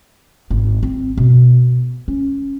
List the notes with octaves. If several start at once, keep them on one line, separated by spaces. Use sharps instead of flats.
G#1 E4
C4
B2
C#4